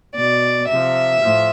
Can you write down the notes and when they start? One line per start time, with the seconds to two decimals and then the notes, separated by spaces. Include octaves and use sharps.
0.16 B2 D5
0.69 C3 F3 E5
1.22 A2 F3